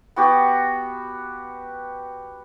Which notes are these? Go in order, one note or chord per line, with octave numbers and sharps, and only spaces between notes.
B3 F#4 G4